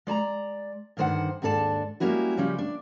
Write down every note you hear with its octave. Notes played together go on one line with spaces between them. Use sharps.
G#3 D5 A5 A#5
G2 D3 D#3 C5 F#5
D#2 G#2 D4 A4 D5 A5
G3 G#3 A#3 C#4 E4 F#4
C#3 F3 G3 C#4
D4